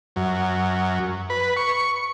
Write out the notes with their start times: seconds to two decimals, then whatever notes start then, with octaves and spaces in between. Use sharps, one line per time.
0.16 F#2
1.30 B4
1.57 C#6